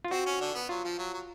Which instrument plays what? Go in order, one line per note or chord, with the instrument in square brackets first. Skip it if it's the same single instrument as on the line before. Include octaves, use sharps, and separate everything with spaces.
[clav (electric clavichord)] F4
[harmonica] C4 [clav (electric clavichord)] F#4
[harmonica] C#4
D3 D4
B3
[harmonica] F#3 [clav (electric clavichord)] F4
[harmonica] F3
F#3
F#3